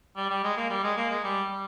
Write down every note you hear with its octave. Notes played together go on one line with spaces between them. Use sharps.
G3
G3
G#3
A#3
G3
G#3
A#3
G#3
G3
G3